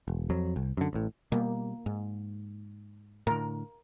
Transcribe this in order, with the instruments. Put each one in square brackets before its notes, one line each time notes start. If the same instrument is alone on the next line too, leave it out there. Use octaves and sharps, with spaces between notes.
[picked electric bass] E1
F2 F#3
C2
F#2 D3
A1 A2
[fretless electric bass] B2 G3 [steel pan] A#3
[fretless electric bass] G#2
[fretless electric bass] A2 D3 [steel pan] A#4